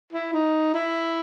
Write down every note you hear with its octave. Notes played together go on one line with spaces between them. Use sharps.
E4
D#4
E4